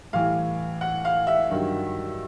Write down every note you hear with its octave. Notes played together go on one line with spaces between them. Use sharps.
A2 E3 G3 F5
F#5
F5
E5
G2 D#3 F#3